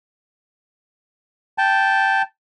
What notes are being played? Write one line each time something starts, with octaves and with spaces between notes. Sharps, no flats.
G5 A5